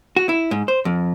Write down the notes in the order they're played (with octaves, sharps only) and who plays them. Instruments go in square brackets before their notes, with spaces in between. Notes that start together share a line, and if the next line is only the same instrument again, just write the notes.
[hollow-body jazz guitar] F#4
E4
G#2
C5
F2